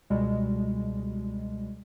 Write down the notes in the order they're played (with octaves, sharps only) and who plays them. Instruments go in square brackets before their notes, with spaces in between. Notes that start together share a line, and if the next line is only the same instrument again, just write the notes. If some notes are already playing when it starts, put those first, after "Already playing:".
[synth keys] C#2 B2 G3 G#3